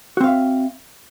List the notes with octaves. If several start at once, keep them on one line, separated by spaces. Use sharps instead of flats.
C4 F#4 E5 F5